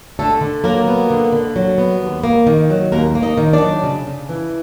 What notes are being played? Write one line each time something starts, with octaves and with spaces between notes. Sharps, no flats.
D3 A3 A4
D3
F#3 A#3 A#4
B3
D3
D3
F#3
B3
D#2
A#3
D#3
F#3
D#2 A#3 A#4
A#3
D#4 D#5
D#3
D4 D5
F#3
C#3
C#3
E3